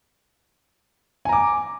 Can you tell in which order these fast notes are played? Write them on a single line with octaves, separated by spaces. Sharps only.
G#5 A#5 D6